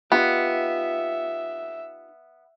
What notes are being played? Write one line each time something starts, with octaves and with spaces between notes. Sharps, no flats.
B3 D#4 F4 G4 E5